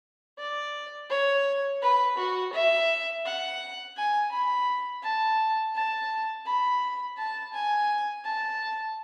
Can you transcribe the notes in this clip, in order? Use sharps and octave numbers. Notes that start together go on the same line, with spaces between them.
D5
C#5
B4
F#4
E5
F#5
G#5
B5
A5
A5
B5
A5
G#5
A5